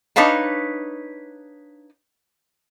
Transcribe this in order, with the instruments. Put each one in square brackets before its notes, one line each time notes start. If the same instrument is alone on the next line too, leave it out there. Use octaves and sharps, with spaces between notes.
[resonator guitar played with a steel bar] D4 D#4 B4 C#5 F5 A5